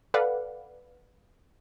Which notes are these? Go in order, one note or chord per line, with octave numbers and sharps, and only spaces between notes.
A4 B4 D5 F5 F#5